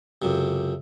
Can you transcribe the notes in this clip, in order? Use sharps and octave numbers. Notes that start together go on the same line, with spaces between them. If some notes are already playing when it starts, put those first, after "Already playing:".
C#2 F#2 C3